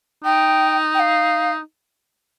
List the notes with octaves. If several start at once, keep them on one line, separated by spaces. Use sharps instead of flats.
D#4 G5
G5
F5